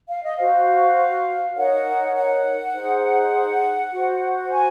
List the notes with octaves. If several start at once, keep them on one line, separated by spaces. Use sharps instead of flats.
F5
D#5
F#4 C5 F5
D#4 A#4 C#5 F#5
F#5
D#4 G#4 C5
F#4 C5
G#5